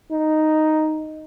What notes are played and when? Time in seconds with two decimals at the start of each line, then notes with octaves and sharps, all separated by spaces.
0.12 D#4